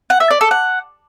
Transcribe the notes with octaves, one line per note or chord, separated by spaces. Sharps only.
F#5
E5
D5
A4
F#5